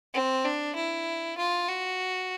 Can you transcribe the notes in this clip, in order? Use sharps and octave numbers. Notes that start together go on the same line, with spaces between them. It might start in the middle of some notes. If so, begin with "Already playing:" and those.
C4
D4
E4
F4
F#4